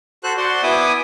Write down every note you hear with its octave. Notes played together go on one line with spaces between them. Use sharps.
F#4 A4 C5 F#6
F#4 C5 D5 F#5 C6
B3 E4 E5 G#5 D6 D#6